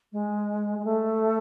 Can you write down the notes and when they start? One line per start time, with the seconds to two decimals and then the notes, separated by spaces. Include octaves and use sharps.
0.12 G#3
0.78 G#3
0.84 A3